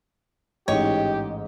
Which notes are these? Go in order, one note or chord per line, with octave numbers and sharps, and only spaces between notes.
A1 G#2 G4 C#5 D#5